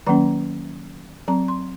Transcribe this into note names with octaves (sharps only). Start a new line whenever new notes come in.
D#3 F#3 A#3 C#4 A#5
F#3 C4 A#5
C6